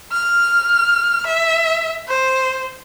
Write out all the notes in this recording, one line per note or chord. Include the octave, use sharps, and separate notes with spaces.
F6
E5
C5